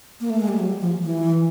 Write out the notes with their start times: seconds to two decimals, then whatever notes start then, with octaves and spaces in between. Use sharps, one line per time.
0.21 A#3
0.30 A3
0.40 G#3
0.48 G3
0.59 F#3
0.81 F3
1.03 E3